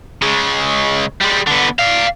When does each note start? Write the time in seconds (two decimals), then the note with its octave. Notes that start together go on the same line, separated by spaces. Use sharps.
0.22 C#3 G#3
1.21 G3 G#3
1.47 D3 B3
1.79 D5 F5